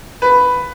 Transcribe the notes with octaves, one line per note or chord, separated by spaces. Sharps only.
B4